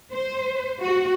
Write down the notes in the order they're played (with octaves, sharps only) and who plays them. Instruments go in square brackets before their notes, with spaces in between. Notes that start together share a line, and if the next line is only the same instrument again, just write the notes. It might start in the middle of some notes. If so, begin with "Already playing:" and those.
[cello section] C5
F#4